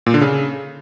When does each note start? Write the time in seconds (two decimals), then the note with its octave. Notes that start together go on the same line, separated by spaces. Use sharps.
0.06 A#2
0.14 D3
0.21 C#3